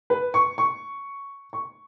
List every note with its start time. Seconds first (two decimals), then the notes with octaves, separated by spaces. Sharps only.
0.10 B4
0.34 C#6
0.58 C#6
1.53 C#6